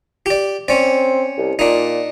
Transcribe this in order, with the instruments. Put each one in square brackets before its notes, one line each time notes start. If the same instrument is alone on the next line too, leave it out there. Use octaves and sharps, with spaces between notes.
[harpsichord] G4 D5
[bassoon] C4 [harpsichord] C#4 D5
[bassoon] C2
[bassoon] A#2 [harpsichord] D4 D#4